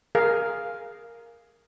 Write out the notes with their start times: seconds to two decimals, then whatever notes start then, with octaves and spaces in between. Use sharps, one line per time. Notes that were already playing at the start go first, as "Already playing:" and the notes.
0.15 G#4 A#4 F5